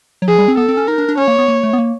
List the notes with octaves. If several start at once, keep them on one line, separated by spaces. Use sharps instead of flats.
F#3
F3 G#4
G3
C4
B3 A4
C4
C#4
D#4 A#4
D4
D4
C#4 C#5
A#3
B3
A#3
A3
B3
A#3